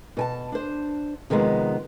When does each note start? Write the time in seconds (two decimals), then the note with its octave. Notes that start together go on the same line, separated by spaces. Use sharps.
0.17 B2 G#5 A5
0.52 D4 C5
1.30 C3 D#3 F3 G#3 B3